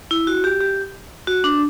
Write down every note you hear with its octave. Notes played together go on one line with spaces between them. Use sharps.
E4
F#4
G4
G4
F#4
D4